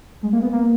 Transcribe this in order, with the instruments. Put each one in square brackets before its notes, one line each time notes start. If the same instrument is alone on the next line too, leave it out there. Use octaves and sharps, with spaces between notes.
[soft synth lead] G#3
A#3
B3
A#3